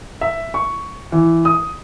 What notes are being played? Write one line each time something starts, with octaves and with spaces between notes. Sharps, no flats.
E5
C#6
E3
D#6